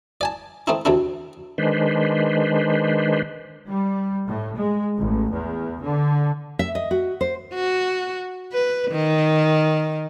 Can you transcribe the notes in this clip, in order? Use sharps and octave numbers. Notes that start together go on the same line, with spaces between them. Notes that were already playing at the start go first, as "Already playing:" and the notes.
D5 G#5 A5
A3 C4 D#4 E4
D2 C3 D4 E4
D#3 G#3 D4 B4 C5
G3
A2
G#3
A1
E2
D3
E5
D#5
F#4
C5
F#4
B4
D#3